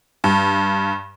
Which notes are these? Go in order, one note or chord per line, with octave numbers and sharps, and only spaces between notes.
G2